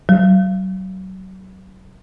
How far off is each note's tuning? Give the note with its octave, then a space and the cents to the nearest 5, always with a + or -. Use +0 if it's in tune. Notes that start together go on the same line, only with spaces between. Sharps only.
F#3 +30